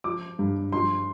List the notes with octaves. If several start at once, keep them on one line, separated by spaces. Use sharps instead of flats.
F3 D6
G2
F3 C6